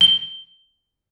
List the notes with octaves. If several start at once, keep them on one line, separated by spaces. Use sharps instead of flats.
G7